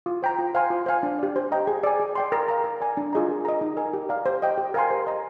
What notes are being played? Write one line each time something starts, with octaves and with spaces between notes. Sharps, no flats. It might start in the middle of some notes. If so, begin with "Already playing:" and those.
F4
C5 G5 A#5
F4
C5 F5 G#5 C6
F4
C5 F5 G#5
D4
G4 D5
C5
D#5 G5 A#5
G#4
D5 G#5
G#4
D5 G5 C6
A#4
F5 A#5
A#4
D5 G#5
D4
F4 G#4 D#5 A#5
A#4
D#5 A#5
D#4
A#4 D#5 G#5
G4
D5 F5 A#5
C5
D#5 G5
G4
A#4 F5 G#5 C6
C5
D#5 A#5